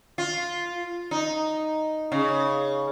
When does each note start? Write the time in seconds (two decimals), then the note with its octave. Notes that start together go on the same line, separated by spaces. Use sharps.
0.18 F4
1.11 D#4
2.12 C#3